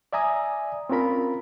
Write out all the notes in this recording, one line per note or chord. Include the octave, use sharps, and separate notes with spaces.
D5 E5 G#5 A#5 D#6
C4 C#4 F4 A#4 B5